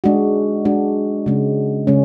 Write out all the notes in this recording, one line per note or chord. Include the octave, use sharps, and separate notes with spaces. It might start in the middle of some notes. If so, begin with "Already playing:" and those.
G#3 D4 F#4
G#3 D4 F#4
C#3 G#3 C#4
C#3 G#3 C#4